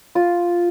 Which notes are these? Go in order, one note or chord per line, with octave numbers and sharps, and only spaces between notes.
F4